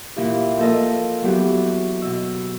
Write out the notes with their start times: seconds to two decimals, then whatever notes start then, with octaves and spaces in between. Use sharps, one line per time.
0.16 A#2 E3 E4 G4
0.58 F3 A#3 A4 A#4 D#5
1.22 E3 F#3 B3 F#4 G4
2.02 B2 D#5 E6